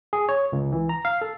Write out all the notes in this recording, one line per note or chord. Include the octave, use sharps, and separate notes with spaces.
G#4
C#5
C#2
E3
A#5
F5
A4